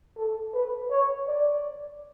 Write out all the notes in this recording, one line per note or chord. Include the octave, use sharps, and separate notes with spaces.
A4
B4
C#5
D5